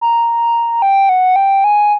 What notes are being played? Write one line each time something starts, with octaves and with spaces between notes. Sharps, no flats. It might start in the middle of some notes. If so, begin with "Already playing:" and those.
A#5
G5
F#5
G5
G#5